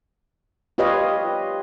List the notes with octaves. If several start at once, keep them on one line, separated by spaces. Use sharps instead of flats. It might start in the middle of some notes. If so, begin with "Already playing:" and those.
F4 G4 B4 C#5 D#5 F5